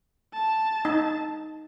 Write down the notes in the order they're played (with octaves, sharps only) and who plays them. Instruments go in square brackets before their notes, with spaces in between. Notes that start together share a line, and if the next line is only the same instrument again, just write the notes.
[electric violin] A5
[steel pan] D#4